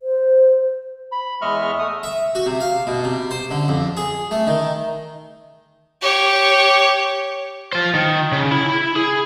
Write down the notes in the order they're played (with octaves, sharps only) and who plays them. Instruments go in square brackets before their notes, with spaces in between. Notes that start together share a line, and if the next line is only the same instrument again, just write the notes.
[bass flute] C5
[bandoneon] B5
E2 G#3 D#5 E5 C#6 F6
A3 D#6
[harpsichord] E5
F#4
C3
F5
B2
C3
C5
D3
F2
G#4
A3
D#3
[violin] G4 C#5
[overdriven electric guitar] F4 C5
D#3
C#3
E4 B5
G#4